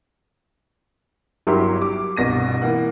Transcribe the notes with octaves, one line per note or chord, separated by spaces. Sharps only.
G1 F#3 E4 G4 A#4 C6
D6
G1 C2 B2 A#6 D#7
E3 A#3 F#5